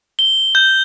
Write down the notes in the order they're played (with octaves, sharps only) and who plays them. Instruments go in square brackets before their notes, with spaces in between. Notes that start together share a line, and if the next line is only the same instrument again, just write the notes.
[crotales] G7
G6